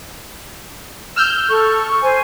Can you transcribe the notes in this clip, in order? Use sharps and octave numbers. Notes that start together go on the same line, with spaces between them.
E6 F6 G6
A4 C#6
C5 G#5